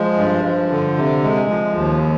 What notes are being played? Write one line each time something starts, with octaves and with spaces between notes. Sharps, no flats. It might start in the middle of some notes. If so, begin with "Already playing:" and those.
Already playing: F3 G#3
G2
F3
D3
C3
G#3
F3
D#2